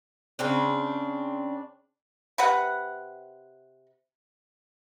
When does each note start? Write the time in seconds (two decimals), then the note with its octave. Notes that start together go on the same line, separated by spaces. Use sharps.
0.39 C#3 C4 D4
2.38 C3 B4 F#5